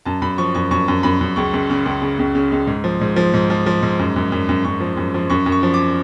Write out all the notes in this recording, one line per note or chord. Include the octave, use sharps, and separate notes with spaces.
F#2 A5
F#2 B5
F3 C#6
F#2 C#6
F#2 C#6
F#2
F#2 B5
F#2
C#2 C#6
C#2
C#3
C#2
C#3
C#2
C#3
C#2
G#2
F3
G#2
F3
G#2
F3
F3
G#2
F#2
F#2
F#2
F#2
F#2 C#6
F3
F#2
F3
F#2 C#6
F#2
C#6
F3
D6